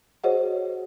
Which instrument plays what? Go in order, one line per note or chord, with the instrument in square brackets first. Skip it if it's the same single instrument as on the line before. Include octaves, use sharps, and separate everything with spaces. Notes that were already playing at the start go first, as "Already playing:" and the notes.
[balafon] F#4 G#4 C5 C#5 D#5 F#5